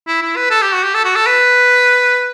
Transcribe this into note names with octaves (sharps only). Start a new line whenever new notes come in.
E4
E4
B4
A4
G4
F#4
G4
A4
F#4
A4
B4